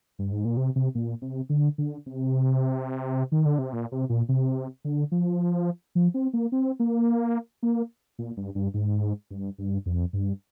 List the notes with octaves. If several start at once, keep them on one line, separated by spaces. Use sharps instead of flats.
G2
G#2
A#2
C3
C3
A#2
C3
D3
D3
C3
D#3
D3
C3
A#2
C3
A#2
C3
D3
F3
F3
C4
A#3
C4
A#3
A#3
A#2
G2
G2
G#2
G2
G2
F2
G2